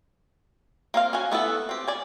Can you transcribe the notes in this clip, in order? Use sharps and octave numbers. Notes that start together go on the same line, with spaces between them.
A#3 C4 F5
C#4 F#4 G#5
A3 B3 E4 A4
C4 G4
D5 G#5